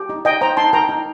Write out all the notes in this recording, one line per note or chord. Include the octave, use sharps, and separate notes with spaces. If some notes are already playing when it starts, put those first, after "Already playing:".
Already playing: G4
D#4
D#4 D#5 G5
C5 G5 A#5
D#4 A5 C6
A#4 G5 A#5
D#4